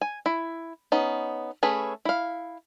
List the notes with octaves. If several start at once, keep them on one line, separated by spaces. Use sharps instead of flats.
G#5
E4
B3 C#4 D#4
A3 C#4 G#4 B4
E4 F5